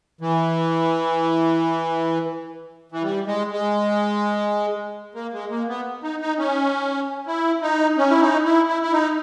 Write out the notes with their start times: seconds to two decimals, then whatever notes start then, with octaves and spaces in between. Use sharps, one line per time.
0.21 E3
2.92 E3
3.03 G3
3.27 G#3
3.51 G#3
5.15 A#3
5.33 G#3
5.50 A#3
5.68 B3
6.03 D#4
6.21 D#4
6.39 C#4
7.27 E4
7.62 D#4
7.97 C#4
8.10 E4
8.21 D#4
8.45 E4
8.68 E4
8.82 E4
8.92 D#4